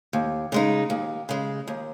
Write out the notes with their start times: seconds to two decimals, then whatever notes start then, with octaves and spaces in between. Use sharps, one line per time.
0.13 D#2
0.52 C#3 G#3 D#4
0.90 D#2
1.29 C#3 G#3
1.68 D#2